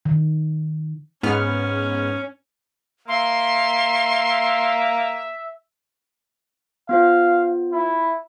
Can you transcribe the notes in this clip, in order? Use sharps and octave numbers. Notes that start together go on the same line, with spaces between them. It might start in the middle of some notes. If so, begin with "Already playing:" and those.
D#3
G#2 B3 C#4 F6
A#3 E5 C6
B3 F4 C5 F5
E4